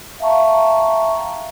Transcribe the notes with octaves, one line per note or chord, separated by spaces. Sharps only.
E5 F5 G5 A5 A#5 C#6